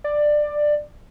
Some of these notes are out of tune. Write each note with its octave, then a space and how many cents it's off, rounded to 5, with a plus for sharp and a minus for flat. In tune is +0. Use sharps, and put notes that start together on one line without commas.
D5 +15